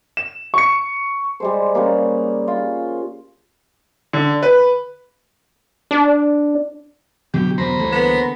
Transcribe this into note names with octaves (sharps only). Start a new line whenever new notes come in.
E7
C#6 C#7
G3 G#3 C5
C#3 G3 A#3
F4
D3
B4
D4
B2 D3 F#3 F#4 G4
E2 G2 B2 C5 A#5 B5
C#2 E3 G3 A3 C#5
D3 A#3 B3